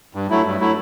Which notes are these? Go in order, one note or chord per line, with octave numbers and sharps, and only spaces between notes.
G2
F#3 A3 E4
G2
F#3 A3 E4